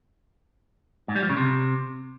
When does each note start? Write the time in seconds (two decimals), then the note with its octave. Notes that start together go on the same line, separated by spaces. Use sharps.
1.08 G#2
1.15 G3
1.23 F3
1.30 C#3
1.37 C3